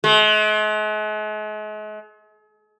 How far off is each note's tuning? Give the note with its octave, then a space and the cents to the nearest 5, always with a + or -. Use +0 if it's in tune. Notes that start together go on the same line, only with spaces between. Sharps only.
G#3 +45